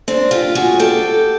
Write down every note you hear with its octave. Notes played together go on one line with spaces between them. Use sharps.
C4 D4
F4 G4
F#4 G#4
G4 A4